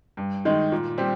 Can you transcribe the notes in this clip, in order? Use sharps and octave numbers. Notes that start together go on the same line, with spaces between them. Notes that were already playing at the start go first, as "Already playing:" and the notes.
G2
D#3 G#3 D#4
A#2
G3 C4 G4